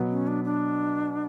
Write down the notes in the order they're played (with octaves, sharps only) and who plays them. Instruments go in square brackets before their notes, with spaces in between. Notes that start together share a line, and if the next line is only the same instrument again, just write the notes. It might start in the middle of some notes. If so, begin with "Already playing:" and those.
Already playing: [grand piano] B2 F#3 B3
[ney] C#4
D4
D4